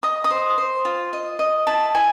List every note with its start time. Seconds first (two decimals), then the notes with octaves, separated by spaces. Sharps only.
0.03 D#5 D#6
0.24 D#6
0.31 C5
0.58 C5
0.85 F4
1.13 D#5
1.39 D#5
1.67 E4 A5
1.95 E4 G#5